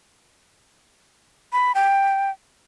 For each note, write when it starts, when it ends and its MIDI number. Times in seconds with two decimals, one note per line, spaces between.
1.53 1.72 83
1.75 2.30 79